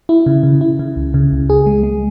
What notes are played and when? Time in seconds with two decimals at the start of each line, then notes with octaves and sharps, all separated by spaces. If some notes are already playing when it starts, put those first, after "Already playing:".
0.09 E4
0.26 C#3
0.43 C#3
0.61 E4
0.79 C#3
0.96 C#2
1.14 C#3
1.32 C#2
1.50 G#4
1.66 G#3
1.83 G#3